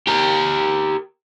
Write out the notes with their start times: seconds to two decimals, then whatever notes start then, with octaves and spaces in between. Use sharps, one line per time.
0.07 G4 A#4